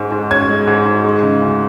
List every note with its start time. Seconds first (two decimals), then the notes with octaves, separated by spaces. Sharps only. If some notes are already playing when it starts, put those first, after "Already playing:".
Already playing: G#2 G#3 C#4
0.12 G#2
0.31 C#4 G#6
0.49 G#3
0.67 G#2
0.86 G#2
1.04 G#3
1.22 C#3
1.41 D2